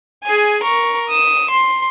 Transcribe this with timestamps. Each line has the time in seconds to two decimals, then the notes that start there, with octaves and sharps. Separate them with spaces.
0.24 G#4 G#5
0.64 A#4 C#6
1.10 D#6 E7
1.51 C6